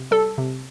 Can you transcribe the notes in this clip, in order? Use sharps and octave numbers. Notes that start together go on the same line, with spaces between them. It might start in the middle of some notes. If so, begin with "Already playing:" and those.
Already playing: C3
G3 A4
C3